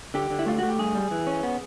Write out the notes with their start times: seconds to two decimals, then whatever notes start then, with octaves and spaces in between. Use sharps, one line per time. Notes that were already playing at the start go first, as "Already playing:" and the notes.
0.14 D3 G4
0.31 D3
0.39 E4
0.46 A3 F4
0.59 A3 F#4
0.68 G4
0.79 G2 G#4
0.95 G3
1.11 E3
1.27 C#4
1.43 B3